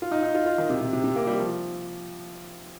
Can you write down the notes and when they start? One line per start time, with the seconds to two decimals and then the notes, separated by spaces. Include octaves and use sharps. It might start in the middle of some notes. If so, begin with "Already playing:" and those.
0.02 F4
0.12 D#4
0.23 D#4
0.35 F4
0.46 F4
0.58 D#3
0.70 C3
0.81 C3
0.93 C3
1.04 C3
1.16 A#3
1.27 G3
1.39 F3